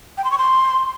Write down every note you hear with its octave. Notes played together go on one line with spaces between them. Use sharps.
G5
C6
C#6
C6